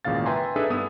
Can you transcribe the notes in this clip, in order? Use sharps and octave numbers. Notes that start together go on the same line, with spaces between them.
G#1 E2 A#2 C#3 F5 A6
B4 E5 G5 G#5 A#5 C6
D4 D#4 G#4 A4 B4 E5
G2 B3 D#6 E6